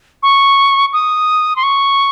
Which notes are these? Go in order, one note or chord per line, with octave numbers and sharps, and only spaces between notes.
C#6
D#6
C6
C#6